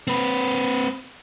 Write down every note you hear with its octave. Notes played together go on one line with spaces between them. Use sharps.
C4 B4